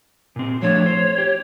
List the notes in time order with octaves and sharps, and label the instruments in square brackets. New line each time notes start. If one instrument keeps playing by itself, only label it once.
[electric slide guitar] A#2 C4
[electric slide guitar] F3 A3 D4 [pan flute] C#5
[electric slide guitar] C5
G4